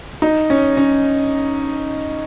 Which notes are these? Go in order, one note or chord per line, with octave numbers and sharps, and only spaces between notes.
D#4
C#4
C#4